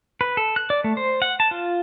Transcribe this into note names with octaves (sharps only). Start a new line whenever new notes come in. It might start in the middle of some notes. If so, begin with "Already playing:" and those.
B4
A4
F#6
D5
A3
C5
F#5
A5
F4